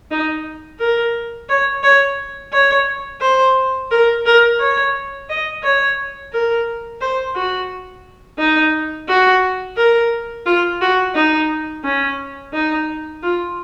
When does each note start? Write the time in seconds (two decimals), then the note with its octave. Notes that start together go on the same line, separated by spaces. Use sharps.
0.11 D#4
0.80 A#4
1.49 C#5
1.83 C#5
2.53 C#5
3.21 C5
3.91 A#4
4.26 A#4
4.60 C#5
5.29 D#5
5.64 C#5
6.33 A#4
7.01 C5
7.36 F#4
8.39 D#4
9.09 F#4
9.77 A#4
10.46 F4
10.81 F#4
11.15 D#4
11.84 C#4
12.53 D#4
13.23 F4